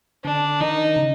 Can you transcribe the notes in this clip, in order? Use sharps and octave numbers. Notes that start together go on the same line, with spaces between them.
D3 D4
D#3 D#4
C#3